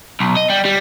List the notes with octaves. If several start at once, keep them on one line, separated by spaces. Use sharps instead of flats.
B1
D#5
G3
G3